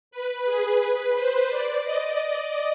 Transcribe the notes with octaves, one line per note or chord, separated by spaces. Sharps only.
B4
G#4
B4
C5
D5
D#5